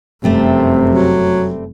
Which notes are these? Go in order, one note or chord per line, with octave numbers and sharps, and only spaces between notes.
F1 F#2 C3 G3 A3 C4
F#3